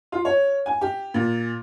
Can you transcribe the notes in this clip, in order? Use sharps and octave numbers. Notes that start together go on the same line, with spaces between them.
F4
C#5
G#5
G4
A#2